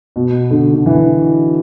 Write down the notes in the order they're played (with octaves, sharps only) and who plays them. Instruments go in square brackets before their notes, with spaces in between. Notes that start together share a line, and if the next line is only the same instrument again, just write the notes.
[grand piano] B2
D3
D3
E3